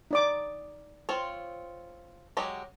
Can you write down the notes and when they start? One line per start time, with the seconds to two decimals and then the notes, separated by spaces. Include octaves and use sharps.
0.11 D#4 D5 D6
1.09 C4 F4 C#5
2.37 F#3 G#3 G4